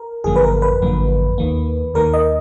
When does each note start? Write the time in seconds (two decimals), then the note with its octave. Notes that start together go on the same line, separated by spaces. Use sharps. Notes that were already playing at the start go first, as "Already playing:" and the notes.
Already playing: A#4
0.24 G#1 F#2 D3 F3 A#3 G#4
0.36 B4
0.44 A#4
0.62 B4
0.81 G#1 F#2 D3 F3 A#3
1.38 D#2 D#3 A#3
1.94 D#2 D#3 A#3 A#4
2.14 D#5